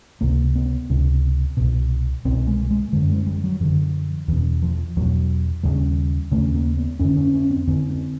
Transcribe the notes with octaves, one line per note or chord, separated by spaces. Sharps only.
C#2 C3 A#3
B3
C#2 C3
C2 B2
C2 B2 C4
G#3
G#3
F#2 D3 G#3
G#3
G3
F#3
F#2 D3 F3
E2 B2 E3
F3
E2 B2 F#3
D#2 C#3 G3
D#2 C#3 A3
A#3
B3
F2 D3 C#4
C#4
C#4
C4
F2 D3 C4
C4